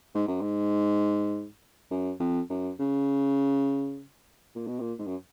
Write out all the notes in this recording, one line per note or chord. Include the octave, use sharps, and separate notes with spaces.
G#2
F#2
G#2
F#2
F2
F#2
C#3
A#2
B2
A#2
G#2
F#2